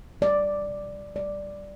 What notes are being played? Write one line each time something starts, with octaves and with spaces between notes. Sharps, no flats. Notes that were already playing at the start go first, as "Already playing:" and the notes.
G3 D5
B2
G3 D5